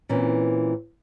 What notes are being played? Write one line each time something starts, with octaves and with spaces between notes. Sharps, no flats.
A#2 E3 C4 C#4